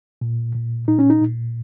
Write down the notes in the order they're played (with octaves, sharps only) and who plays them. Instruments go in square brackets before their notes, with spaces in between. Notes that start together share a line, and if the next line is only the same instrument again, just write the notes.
[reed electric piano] A#2
A#2
A#2 D#4
C#4
D#4
A#2